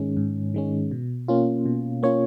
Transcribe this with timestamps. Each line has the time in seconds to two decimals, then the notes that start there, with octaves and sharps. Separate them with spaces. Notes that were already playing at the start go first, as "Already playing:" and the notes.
Already playing: G#2 D#3 G#3 C#4
0.17 G#2
0.54 D#3 G#3 C#4
0.91 B2
1.28 A#3 C#4 F4
1.66 B2
2.03 A#3 C#4 F4 C#5